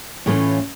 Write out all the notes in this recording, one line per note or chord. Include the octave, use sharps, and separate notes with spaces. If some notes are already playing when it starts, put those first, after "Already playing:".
A2 E3 A3 C#4 F4